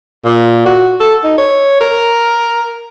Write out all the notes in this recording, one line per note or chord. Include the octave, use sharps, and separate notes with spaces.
A#2
F#4
A4
D#4
C#5
A#4